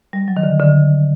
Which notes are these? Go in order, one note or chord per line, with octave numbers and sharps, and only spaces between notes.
G3
F#3
D#3
D3
D3